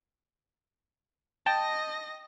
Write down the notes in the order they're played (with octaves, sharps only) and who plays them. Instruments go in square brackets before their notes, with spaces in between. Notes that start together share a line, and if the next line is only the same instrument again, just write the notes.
[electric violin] D#5 A#6 [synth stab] G5 A5